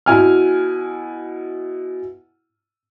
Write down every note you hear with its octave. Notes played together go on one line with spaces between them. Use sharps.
B2 E4 G#5 F6